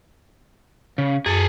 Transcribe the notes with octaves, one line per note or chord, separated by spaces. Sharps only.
C#3
F#2 G#4 A4